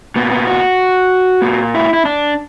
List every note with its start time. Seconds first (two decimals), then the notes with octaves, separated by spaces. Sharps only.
0.16 A#2 B3
0.31 B3
0.47 F#4
1.42 A#2
1.74 E4
1.93 E4
2.05 D4